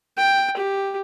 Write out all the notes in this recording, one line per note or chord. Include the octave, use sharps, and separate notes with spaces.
G5
G4